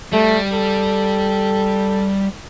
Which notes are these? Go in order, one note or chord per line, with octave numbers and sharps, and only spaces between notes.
G3 A3
A4